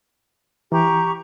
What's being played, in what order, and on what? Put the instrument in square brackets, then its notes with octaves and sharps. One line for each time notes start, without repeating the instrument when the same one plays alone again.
[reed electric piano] E3 [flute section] G4 A#5 C#6